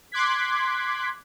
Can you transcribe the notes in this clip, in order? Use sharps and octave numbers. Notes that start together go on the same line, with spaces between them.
C6 D6 F#6 G#6 B6